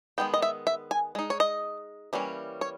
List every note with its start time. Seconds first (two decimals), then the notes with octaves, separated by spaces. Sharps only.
0.18 D#3 G#3 B3 G5
0.34 D#5
0.42 E5
0.67 E5
0.91 G#5
1.15 G#3 D#4
1.30 C#5
1.40 D#5
2.13 E3 G3 A#3 C#4
2.61 C#5